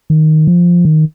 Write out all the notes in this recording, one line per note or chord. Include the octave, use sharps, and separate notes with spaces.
D#3
F3
D#3